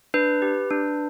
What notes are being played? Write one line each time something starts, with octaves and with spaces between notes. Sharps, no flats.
D4 B4
G4
D4